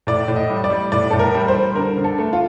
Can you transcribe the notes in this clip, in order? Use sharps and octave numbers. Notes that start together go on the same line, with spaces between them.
A2 D5
A2
D#5
G3
D5
G3
A2 D5
A2 A4
A#4
G3
C5
G3
D3 A#4
D3
A4
A3
F4